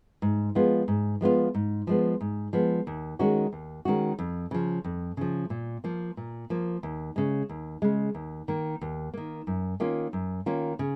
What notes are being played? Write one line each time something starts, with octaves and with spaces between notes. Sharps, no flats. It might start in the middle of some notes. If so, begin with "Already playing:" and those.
G#2
F3 G#3 B3 F4
G#2
F3 G#3 B3 F4
G#2
F3 G#3 B3
G#2
F3 G#3 B3
D#2
D#3 G#3 C#4 F#4
D#2
D#3 G#3 C#4 F#4
F2
C#3 F3
F2
C#3 F3
A#2
F3 A#3
A#2
F3 A#3
D#2
C#3 G#3
D#2
C#3 G#3
D#2
D#3 A#3
D#2
D#3 A#3
F#2
D#3 A#3 C#4 F4
F#2
D#3 A#3 C#4 F4
C#3